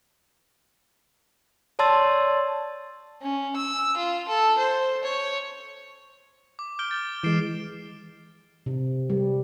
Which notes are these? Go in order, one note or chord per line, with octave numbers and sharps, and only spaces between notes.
C#5 D5 A5 C6 E6 A6
C#4
E6
F4
A4
C5
C#5
D6
F6 G6 D7 G7
A6
E3 G#3 C7 D7 E7
C3
G3